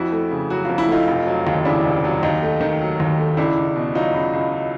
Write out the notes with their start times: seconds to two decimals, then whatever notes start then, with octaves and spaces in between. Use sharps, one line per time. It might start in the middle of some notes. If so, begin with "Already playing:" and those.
Already playing: F2 E4 F#4
0.12 A3
0.31 C#3
0.50 F#3 F#4
0.65 F2 F4
0.78 E4
0.88 A3 D#4 F4
1.07 F1
1.27 F#3
1.47 D#2
1.65 C#3 D4 E4
1.85 F1
2.04 F#3
2.23 D#2 D#4
2.43 A3
2.61 D#3
2.81 F#3
3.00 D#2
3.19 A3
3.37 C#2 D4 E4
3.58 C#2
3.76 B2
3.95 F#3 D#4 F4
4.15 C#2
4.33 C#2